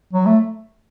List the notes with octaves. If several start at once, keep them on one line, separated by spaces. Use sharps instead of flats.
F#3
A3